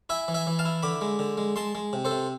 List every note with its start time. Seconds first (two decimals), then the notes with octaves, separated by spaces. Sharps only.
0.09 E4 E5 G#5
0.28 E3
0.34 E5 G#5
0.47 E3
0.59 F5 A5
0.65 E4
0.83 D3 B5 D6
1.01 G#3
1.19 D3
1.37 G#3
1.56 G#3 A5 C6
1.75 G#3
1.93 C3
2.05 A4 C5
2.11 C3